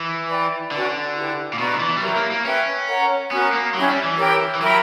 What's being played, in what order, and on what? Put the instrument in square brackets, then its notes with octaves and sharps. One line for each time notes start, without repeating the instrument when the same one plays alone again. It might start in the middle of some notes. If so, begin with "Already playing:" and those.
Already playing: [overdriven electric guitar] E3
[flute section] B4 D5 G5
[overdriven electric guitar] D3 [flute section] C#4 F#4 B4 D5
[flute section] E4 G4 B4
[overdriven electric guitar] A#2
[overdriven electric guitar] B2 [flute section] B4 D5 A#5 C#6
[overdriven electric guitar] D3
E3
G3
[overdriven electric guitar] F#3 [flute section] E4 G4 A#4 E5
[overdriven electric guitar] A#3
A#3
[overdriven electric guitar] C#4 [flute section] B4 E5 G5
[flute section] A#4 C#5 F#5 A#5
[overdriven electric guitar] B3 [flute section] C#4 F#4 A#4
[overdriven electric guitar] A#3
[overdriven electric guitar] F#3 [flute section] C#4 E4 G4
[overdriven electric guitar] G3
E3
[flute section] G4 A#4 C#5 G5
[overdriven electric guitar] E3
[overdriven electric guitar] F#3 [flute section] A#4 E5 G5 B5